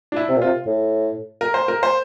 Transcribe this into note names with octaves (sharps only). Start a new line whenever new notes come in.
D4
E4
C3
A#2
C3 F4
A2
A#4
C5
A#4
C5